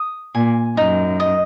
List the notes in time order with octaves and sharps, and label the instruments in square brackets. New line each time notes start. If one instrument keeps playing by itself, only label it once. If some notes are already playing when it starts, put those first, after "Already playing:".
Already playing: [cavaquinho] D#6
[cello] A#2 [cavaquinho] G#5
[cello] F#2 [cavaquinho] D#4
[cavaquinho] D#5